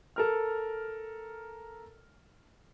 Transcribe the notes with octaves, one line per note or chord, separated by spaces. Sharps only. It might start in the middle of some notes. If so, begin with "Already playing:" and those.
A4 A#4 F6